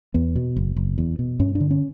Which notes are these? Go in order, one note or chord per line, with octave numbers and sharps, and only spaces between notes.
E2 B3
B2
F#1
F#1
E2
B2
G2 C#4
D4
D3
C#4